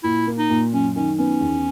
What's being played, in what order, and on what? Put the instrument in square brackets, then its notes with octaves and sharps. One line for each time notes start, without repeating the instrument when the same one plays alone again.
[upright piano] A#2 [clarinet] E4
[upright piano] A#3
[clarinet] D#4
[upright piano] A#2
[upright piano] F#2 [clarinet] C#4
[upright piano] D#3 [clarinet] C#4
[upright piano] B3 [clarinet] C#4
[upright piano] E2